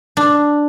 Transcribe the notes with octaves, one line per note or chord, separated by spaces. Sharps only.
D4